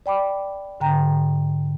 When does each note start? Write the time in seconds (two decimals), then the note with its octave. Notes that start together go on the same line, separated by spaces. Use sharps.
0.06 D5 G5 B5 D6
0.80 G#2 D3 G5 A#5